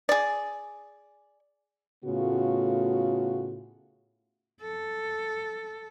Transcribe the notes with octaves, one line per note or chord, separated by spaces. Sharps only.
G#4 D5
A2 C#3 A3 B3 F4 F#4
A4